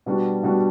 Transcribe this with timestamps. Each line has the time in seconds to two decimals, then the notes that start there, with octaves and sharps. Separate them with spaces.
0.06 B2 G3 D4 F#4
0.43 B2 G3 D4 F#4